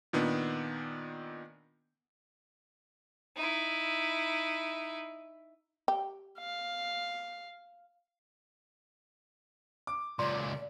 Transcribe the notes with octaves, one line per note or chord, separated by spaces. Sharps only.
A#2 D#3 B3 D4
D#4 E4
G4
F5
D6
C#2 A#2 D5 C6